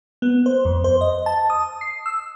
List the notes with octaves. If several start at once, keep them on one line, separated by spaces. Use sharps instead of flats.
B3
C5
F2
C5
D#5
A5
D#6
C7
E6